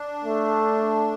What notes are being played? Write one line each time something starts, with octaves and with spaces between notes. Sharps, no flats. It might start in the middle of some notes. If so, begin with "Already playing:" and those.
Already playing: D4
A3